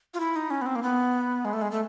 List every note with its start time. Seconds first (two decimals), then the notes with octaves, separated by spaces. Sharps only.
0.14 F4
0.20 E4
0.36 D#4
0.50 C#4
0.62 B3
0.66 C4
0.76 A#3
0.83 B3
1.45 G#3
1.53 A3
1.62 G#3
1.71 A3